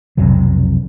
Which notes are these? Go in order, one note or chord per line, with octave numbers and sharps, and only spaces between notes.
B1 F2 C3 F#3